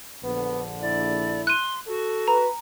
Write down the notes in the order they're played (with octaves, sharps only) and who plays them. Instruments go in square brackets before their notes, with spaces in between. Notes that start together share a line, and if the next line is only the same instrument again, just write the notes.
[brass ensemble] A#1 D3 [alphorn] B3
[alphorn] E4 [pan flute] D5
[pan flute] C6 [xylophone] F#6 D#7
[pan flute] F#4 [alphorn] A4
[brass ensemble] B4 [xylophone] A#5